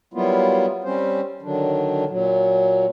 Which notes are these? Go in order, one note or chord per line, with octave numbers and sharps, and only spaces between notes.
F#3 G3 A#3 B3 E4 F4
G3 C4 C#4 C5
D3 D#3 F#3 D4
A#2 F#3